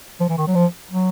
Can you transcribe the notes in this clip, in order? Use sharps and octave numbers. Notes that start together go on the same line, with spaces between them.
F3
E3
D#3
F#3
F3
F#3